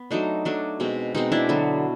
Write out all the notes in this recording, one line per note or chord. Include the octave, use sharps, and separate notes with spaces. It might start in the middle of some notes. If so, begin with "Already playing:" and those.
Already playing: B3
F#3 A3 D4 D#4
F#3 A3 D4
B2 G#3 C4
B2 G#3 C4 D#4
D4 E4
D3 F#3 B3